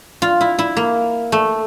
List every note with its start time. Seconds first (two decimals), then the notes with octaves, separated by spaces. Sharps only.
0.22 F4
0.41 E4
0.59 E4
0.77 A#3
1.32 A3